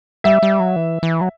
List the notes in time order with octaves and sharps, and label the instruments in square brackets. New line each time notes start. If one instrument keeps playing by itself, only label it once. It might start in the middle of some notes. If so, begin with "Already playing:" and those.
[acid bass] G3 [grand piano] E5
[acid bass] G3
F#3
E3
E3
F#3